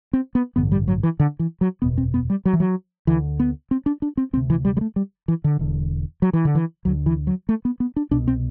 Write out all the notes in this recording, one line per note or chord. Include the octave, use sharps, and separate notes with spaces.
C4
B3
A1 G2 D3 B3
G3
F#3
E3
D3
E3
F#3
F#1 E2 B2 B3
C4
B3
G3
F#3
E3
F#3
D2 D3 E3
B3
C4
D4
D4
C4
D2 C3 C4
E3
G3
G3
A3
G3
E3
D3
E1 E2 D3
F#3
E3
D3
E3
D2 D3 F#3
E3
F#3
A3
B3
B3
D4
C2 B2 D4
C4